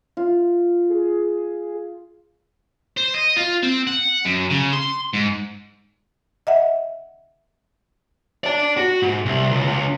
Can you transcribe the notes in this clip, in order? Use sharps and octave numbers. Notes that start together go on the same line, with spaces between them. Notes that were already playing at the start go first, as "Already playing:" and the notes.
F4
G#4
C5
D#5
F4
C4
F#5
F#2
C#3
C6
G#2
D#5 E5 F#5
D5 A5
F#4
G#2
C2
C#2
C#2